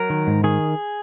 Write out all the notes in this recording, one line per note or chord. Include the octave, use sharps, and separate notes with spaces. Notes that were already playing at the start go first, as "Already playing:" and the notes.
Already playing: F#3 A#4
D#3
G#2
D#3 G#4